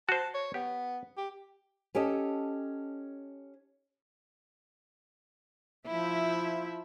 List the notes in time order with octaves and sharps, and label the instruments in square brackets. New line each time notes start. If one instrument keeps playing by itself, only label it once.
[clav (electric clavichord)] F#4 C5 [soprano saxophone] A5
[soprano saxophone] C#5
[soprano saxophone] B3 [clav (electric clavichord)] G4
[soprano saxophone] G4
[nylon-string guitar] C#4 G4 A4 D#5
[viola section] F3 E5 [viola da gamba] E4